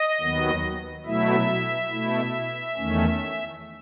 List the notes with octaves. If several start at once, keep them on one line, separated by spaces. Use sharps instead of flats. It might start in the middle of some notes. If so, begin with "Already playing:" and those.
Already playing: D#5
D#2 D#3 F#3 B3
B2 F#3 A3 E4 E5
B2 A3 E4
E2 D#3 A3 C#4